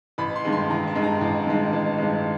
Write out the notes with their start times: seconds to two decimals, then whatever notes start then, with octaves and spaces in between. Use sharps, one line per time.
0.18 A1 B5
0.36 C6
0.44 G2 D#3 G#3
0.52 C6
0.70 A1 A#5
0.87 A5
0.95 G2 D#3 G#3
1.03 A#5
1.21 A1
1.46 G2 D#3 G#3
1.73 A1
1.98 G2 D#3 G#3